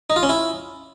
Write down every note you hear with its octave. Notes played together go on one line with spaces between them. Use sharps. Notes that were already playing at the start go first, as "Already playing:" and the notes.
D#4
F4
C#4
E4